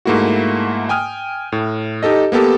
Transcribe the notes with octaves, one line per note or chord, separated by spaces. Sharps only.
G#2 A3 A#3 E4 F#4
G5 G#5 D#6 F6
A2
D#4 G4 A4 D#5
A#3 B3 G4 A4